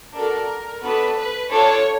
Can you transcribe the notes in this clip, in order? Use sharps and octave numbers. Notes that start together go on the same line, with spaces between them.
D4 F#4 A4 A#4
B3 D4 F#4 A4 B4
B4
D4 F4 A4 C#5